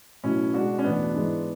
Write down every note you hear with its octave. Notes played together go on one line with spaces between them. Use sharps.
B2 F#3 A3 C#4 E4
B2 G#3 D4 F#4
C#4
E2 B2 A3 B3 D4
G#2 E3 G#3